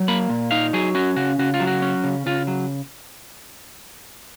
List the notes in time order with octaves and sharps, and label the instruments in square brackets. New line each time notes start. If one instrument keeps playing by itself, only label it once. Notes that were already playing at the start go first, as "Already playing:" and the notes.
Already playing: [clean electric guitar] F#3
A#3 B5
A#2
D#4 F5
F#3 G#4
C#4 F#4
C#3 F#4
C#3 F#4
F4
F#3
F#4
C#4
C#3
C#3 F4
F#3